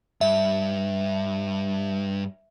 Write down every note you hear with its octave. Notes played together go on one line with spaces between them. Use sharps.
G2 E5